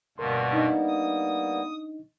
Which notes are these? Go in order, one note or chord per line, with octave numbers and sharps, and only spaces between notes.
D2 G2 B2 G3 A#3 B3 A#4 C6
D4 D#4 D#5
D#6